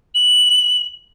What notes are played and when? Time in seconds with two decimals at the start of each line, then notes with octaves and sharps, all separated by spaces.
0.15 F#7